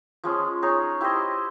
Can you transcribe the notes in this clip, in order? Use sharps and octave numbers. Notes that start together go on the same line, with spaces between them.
F3 G#3 C#4
D#4 G#4 C#5
E4 G4 C5 D#5